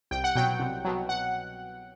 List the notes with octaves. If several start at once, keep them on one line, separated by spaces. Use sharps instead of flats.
C2 G5
F#5
B2 F#3 G5
C2
B2 F#3
F#5